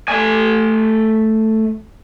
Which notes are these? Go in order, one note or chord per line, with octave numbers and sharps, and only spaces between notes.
A3 G#5